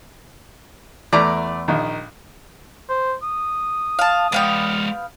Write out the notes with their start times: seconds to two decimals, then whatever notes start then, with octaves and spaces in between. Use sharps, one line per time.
1.13 E2 A3 D5 A#5
1.68 A#1 D#3
2.89 C5
3.23 D#6
3.99 F5 A5
4.32 G#3 B3 D5 F5 G5